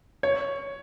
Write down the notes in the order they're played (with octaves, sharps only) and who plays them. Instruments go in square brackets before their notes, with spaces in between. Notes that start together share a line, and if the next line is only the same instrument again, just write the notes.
[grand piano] C#5